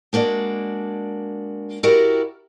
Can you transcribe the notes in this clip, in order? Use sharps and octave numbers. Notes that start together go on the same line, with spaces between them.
G#3 A#3 D4 F#4 D5
E4 F#4 G4 A#4 D5